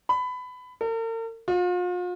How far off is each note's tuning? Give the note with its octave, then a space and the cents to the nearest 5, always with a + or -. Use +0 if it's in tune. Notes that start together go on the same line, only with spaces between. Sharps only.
B5 +20
A#4 -45
F4 +40